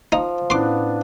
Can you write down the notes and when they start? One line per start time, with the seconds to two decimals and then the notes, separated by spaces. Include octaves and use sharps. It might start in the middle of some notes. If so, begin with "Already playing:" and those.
0.12 F3 D#4
0.50 A2 B3 C#4 D4 E4 C6 D6